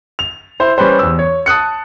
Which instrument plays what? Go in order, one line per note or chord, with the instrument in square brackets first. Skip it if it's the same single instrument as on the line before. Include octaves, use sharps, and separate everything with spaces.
[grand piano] F7
E4 C5
G3 C#4 B4 C5
E2 E6
C#5
A5 D#6 F#6 C#7